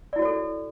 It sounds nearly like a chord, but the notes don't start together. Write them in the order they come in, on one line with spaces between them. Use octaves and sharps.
D5 E4 F#4 C#5 A4